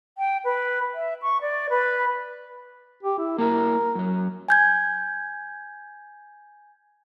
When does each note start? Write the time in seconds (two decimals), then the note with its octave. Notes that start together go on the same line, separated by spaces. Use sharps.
0.18 G5
0.44 B4
0.95 E5
1.22 C#6
1.41 D5
1.70 B4
3.03 G4
3.18 E4
3.38 A#3 E4 A#4 E5
3.95 F#2 F#3
4.49 G#5 G6 G#6